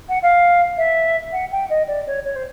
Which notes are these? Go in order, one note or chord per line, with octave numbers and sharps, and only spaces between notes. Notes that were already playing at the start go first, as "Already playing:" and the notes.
F#5
F5
E5
F#5
G5
D#5
D5
C#5
C#5
C5